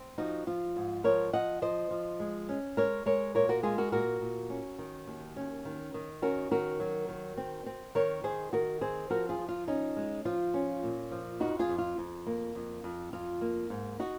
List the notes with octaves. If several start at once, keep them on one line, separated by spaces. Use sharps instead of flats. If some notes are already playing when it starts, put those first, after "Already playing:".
Already playing: C4
F3 D#4 F#4
F3 F4
G#2
F3 A#4 C#5
F3 D#5 F#5
F3 C5 D#5
F3
G#3
C#4
G#3 A#4 C#5
G#3 A#4 C#5
A#2 A#4 C#5
F#4 A#4
G#3 F4 G#4
F#4 A#4
A#2 F#4 A#4
A#2
C#4
D#3
D#2
C#4
D#3
D#3
C#4 F#4 A#4
D#3 F#4 A#4
F#3
D#3
C4
C4
D#3 A#4 C#5
D#3 G#4 C5
D#3 F#4 A#4
C4 G#4 C5
F3 F#4 A#4
F4 G#4
F3
F4
C#4 D#4
G#3
F3 F4
C#4
A#2
F3
F2 D#4 F#4
F4 G#4
F2
F4
F2
A#3
F2
F2
F2 F4
A#3
G#2
D#4 F#4